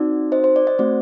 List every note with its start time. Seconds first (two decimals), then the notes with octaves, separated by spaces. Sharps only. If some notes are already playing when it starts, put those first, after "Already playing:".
Already playing: C4 D#4 F#4 D5
0.32 C5 D#5
0.44 C5
0.56 D5
0.67 C5 D#5
0.79 A3 C4 F#4 D5